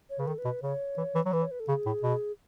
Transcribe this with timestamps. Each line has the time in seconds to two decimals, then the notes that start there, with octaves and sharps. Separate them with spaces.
0.10 C#5
0.19 C#3 B4
0.27 D#3 A4
0.38 B4
0.45 B2
0.63 C#3 C#5
0.97 E3
1.15 E3
1.25 F#3 C#5
1.33 E3 B4
1.42 C#5
1.51 B4
1.60 A4
1.68 C#3 G#4
1.86 A2
2.03 B2